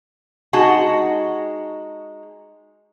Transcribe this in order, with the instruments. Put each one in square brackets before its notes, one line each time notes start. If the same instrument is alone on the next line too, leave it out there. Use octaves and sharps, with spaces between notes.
[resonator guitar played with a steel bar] G#3 D#4 F#4 F#5 A5